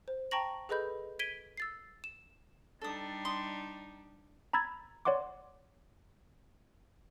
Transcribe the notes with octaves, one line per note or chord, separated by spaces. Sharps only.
C5
G5 A5 A#5 C#6 A#6 F#7
G#4 A4 B4 D#5 B5 G6
G#6 B6 D7 D#7 G7
E6 A6 C7
E7
G3 D4 D#4 A4 D#6
C6 D#6
A#5 B5 E6 G#6 A6
C#5 D5 F#5 C6 D6